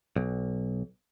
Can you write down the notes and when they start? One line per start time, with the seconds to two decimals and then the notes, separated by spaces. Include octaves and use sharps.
0.16 B1